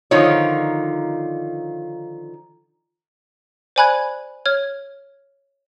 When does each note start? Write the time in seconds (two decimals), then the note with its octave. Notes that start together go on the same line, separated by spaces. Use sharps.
0.11 D3 D#3 F3 D#4 F4 C#5
3.76 C5 D5 G#5 B5 F#6 G#6
4.46 C#5 F6 G#6